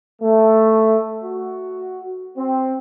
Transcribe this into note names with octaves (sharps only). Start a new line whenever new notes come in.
A3
F#4
C4